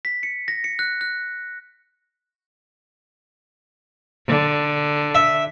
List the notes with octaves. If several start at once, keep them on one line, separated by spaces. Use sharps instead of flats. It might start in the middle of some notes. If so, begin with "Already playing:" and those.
B6
C#7
A#6
C#7
F#6
F#6
D3
E5